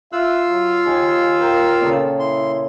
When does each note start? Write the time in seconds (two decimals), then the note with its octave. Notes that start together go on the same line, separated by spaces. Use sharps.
0.12 F4 E5 F5 E6 F#6
0.48 F#3
0.86 D#2 G#5
1.40 A#4 G5
1.81 A#2 C#3 A4
2.20 E4 C6